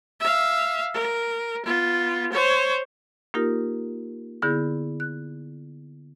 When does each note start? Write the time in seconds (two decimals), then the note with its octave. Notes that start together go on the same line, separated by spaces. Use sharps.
0.20 E5 F5
0.94 A#4
1.66 B3 F4
2.33 C5 C#5
3.34 A#3 D#4 F4 G4 A#4
4.42 D3 B3 E4 G#4 G6 A#6
5.00 F#6